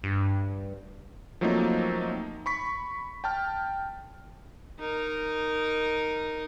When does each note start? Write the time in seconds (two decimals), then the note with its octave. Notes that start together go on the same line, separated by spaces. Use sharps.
0.03 G2
1.41 F3 F#3 A3 A#3 C4 D#4
2.46 B5 C#6 B6
3.24 G5 A5 F6
4.79 D#4 A#4